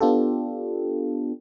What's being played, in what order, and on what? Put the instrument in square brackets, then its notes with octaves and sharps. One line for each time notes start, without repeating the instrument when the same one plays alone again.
[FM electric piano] B3 D4 F4 G4 A4